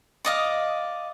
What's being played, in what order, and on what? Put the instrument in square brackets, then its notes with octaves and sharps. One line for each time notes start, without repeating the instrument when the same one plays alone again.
[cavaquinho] D5 D#5 F5